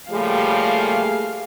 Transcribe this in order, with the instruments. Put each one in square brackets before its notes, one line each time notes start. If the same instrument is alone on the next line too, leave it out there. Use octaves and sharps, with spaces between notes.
[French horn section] C#3 F3 G3 [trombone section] A3 A#3 G#4 [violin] F5